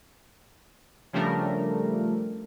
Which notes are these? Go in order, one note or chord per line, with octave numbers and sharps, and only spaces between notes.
C#3 F3 G3 A3 D4 A#4